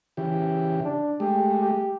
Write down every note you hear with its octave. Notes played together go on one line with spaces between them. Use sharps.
C#3 E3 G4
D4
G#3 A3 G4
G4